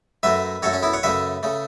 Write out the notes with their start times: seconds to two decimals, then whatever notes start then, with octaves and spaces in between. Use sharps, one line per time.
0.23 F#2 F#3 A3 B4 E5
0.63 F#2 F#3 A3 A4 C#5
0.73 C#4
0.83 B3 E4
0.93 C#5 F#5
1.03 F#2 C#3 A3 B4 E5
1.43 C#3 A3